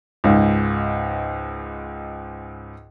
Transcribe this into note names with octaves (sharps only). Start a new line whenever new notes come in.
C#2 G#2